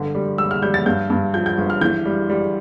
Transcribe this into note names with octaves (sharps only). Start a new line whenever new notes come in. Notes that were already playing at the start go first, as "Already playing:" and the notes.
Already playing: G1 D3
G3
G3 E6
F6
G3 G6
A6
G2 G6
G2
F3 G6
G6
G1
F6
E3 G6
G3
G3